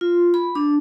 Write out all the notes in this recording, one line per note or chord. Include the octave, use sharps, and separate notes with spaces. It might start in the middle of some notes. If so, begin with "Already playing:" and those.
F4
B5
D4